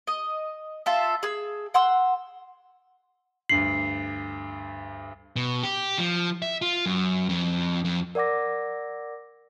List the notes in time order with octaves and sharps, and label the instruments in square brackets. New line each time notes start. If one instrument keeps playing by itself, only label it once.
[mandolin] D#5
F4 A4 E5
G#4 E6
F#5 C6 E6
[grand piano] D2 G2 F#7 [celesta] C7
[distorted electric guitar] B2
G4
F3
E5
F4
F#2
F2
F2
[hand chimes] A#4 D5 F#5 D6 A#6